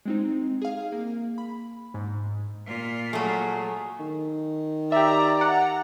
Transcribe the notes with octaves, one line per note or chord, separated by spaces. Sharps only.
G#3 C4 D#4
G#4 F5
A#3
B5
G#2
A#2 F4
F#3 A3 G#4
D#3
G4 D5 E5 A#5
F#5 A#5